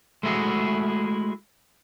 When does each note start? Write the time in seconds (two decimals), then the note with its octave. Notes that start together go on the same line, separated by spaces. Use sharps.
0.23 G#3 A3 E4 F#4 G#4